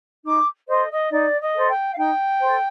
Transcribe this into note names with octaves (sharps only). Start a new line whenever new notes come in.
D#4 D6
A4 C5 D#5
D#5
D#4 D5
D#5
A4 C5
G5
F5
D#4 G5
A4 C5